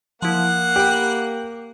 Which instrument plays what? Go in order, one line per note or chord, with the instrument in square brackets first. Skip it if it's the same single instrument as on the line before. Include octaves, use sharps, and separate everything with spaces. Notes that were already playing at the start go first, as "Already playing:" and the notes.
[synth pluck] F3 E4 [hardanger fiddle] A#3 [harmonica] F#5
[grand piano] G4 [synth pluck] B5 D7